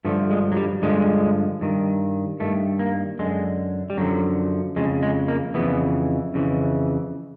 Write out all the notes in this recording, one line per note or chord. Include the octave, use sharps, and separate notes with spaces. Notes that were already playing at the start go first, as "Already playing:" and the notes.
G2 D3 F3 A3
G#3
F#3
G3
G2 D3 F3 G#3
G2 D#3
G2 D#3 A3
A#3
F#2 D3 G#3
G3
F#2 D3 F3 F#3
F2 C#3 G#3
G#3
A#3
F2 C#3 E3 B3
F2 C#3 E3